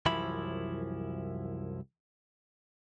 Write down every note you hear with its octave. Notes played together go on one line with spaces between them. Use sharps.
C2 F#2 E3 F3 E4 B5